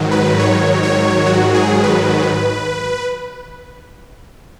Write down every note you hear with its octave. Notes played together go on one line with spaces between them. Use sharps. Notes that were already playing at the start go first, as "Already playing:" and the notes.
Already playing: G#2 D#3 F#3
B4
C#5
C#5
F#4
G#4
B4